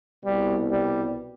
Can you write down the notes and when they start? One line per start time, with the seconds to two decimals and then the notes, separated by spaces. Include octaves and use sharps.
0.23 C2 B2 G3
0.70 G3